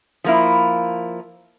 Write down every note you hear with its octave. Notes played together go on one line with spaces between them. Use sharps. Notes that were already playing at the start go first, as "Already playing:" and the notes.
F3 A#3 E4